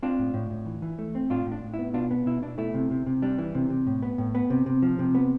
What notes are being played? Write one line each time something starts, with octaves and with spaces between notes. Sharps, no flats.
C4 D4 F4
A2
A2
A2
E3
E3
A3
C4
A2 D4 F4
A2
D4
A2
E4
B3
B2 D4 F4
B3
B2 E4
B2 D4
A3 E4
C3
C3
C3
G3 D4
E3
C3
C3
A2
B3
A2
B3
C3
C3
F3
C3
B3